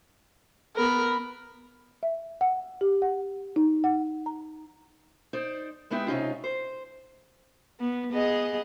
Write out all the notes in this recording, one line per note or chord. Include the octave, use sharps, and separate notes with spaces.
B3 A#4 B5
E5
F#5
G4
F#5
D#4
F#5
A#5
D#4 C5 D5
G#3 B3 D#4 E4 G4
C3 C#4 D#4 F4
C5
B3
B3 G#4 D#5